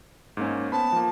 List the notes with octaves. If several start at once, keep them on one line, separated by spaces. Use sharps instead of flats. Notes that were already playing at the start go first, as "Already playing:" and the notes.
G#2 A#3 C#4
B3 C5 A5 B5
F3 A#3